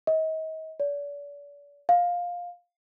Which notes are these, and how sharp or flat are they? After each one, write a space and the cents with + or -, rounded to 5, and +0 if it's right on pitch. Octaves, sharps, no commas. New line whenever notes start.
D#5 +35
D5 -40
F5 +15